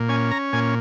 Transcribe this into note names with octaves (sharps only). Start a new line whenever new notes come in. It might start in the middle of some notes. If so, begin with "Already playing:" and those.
Already playing: A#2
C#4 G#5
A#5
A#2 G#5